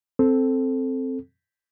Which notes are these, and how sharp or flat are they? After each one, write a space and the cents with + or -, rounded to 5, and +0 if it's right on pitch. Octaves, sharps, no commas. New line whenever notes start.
C4 +0 A4 +0